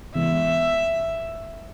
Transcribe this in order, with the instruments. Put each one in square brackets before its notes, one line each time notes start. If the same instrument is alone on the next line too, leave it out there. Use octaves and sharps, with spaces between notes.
[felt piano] E3 G#3 B3 [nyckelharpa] E5